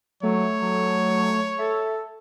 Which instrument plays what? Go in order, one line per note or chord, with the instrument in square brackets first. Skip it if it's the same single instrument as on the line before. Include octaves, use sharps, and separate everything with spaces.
[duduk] F#3 [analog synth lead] A3 [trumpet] C#5
[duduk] F#3
[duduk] A4 [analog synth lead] E5